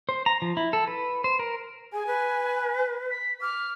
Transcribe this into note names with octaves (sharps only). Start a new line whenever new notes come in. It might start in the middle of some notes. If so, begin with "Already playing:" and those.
C5
A#5
F3
E4
A4
B4
C5
A#4
G#4 G#5
B4
B6
D6 F6